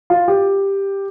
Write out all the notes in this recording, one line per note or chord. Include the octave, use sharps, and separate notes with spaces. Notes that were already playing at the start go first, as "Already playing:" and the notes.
F4
G4